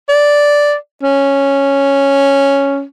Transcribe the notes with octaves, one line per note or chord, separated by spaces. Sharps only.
D5
C#4